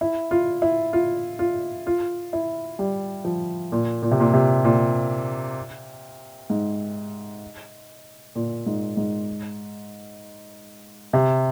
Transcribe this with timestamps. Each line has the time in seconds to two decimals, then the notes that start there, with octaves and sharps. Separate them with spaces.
0.01 E4
0.31 F4
0.62 E4
0.93 F4
1.39 F4
1.87 F4
2.33 E4
2.79 G3
3.25 F3
3.72 A#2
4.02 A#2
4.11 C3
4.20 A#2
4.34 C3
4.64 A#2
6.50 G#2
8.35 A#2
8.66 G#2
8.97 G#2
11.13 C3